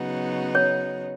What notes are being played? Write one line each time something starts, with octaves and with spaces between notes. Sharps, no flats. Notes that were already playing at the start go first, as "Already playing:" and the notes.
Already playing: C#3 F#3 B3 D#4 F#4
C#5